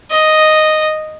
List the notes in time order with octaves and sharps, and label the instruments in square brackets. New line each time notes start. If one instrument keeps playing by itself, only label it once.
[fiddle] D#5